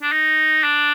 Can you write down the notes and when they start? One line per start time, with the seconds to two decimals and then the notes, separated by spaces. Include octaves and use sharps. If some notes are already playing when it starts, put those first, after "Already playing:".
0.02 D4
0.12 D#4
0.63 D4